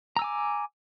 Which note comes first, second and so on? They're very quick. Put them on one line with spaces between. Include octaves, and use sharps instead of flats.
A#5 E6 G#5 D6